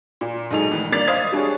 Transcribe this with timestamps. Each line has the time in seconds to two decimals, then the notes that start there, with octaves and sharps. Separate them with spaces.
0.21 A#2
0.51 B1 G#2 D#4 G#4 A4 F7
0.71 A1 G#2 D#3 E3
0.92 G2 A#3 D5 A6 F7
1.08 C5 D#5 F5 D#6 G#6 A6
1.32 G3 D4 G#4 C#5